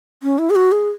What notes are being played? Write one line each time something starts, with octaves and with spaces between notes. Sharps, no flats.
C#4
E4
G#4
F#4
G#4